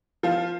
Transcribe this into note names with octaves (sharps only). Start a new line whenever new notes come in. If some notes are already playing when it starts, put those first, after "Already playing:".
F3 F4